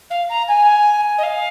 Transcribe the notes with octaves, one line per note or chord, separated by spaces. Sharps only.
F5
A#5
G#5
D#5
F5